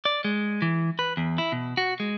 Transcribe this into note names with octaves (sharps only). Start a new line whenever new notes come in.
D5
G#3
E3
B4
E2
E4
B2
F#4
G#3